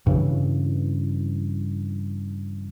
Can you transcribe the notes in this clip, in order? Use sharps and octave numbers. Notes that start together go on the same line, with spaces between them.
G2 C#3 E3